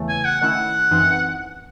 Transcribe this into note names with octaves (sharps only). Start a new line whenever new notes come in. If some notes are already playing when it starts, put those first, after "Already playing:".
Already playing: E2 C#3 E3 A3
G#5
F#5
D#3 A3 C#4 E4 F#5
F#2 E3 C4 D#4